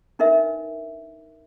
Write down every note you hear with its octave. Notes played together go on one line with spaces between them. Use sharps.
D4 D#4 A#4 B4 E5